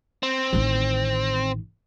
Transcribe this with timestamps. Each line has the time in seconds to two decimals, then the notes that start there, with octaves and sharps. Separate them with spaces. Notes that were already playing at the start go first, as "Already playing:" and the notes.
0.23 C4
0.53 A1 D#3